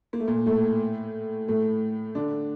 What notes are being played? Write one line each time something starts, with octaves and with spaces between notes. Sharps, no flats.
A#3
A3
A#2 A#3
A2 A3
A2 A3
D3 D4